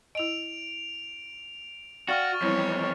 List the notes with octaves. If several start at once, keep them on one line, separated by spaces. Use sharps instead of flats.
E4 D#5 D7 F7
F#4 D5 F5 G5 C#6 F6 A6
F2 E3 G3 C4 E4 C#5